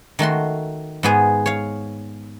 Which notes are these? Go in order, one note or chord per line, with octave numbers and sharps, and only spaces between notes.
D#3 A3 F#4 C6
G#2 B3 G#4
C#5 F5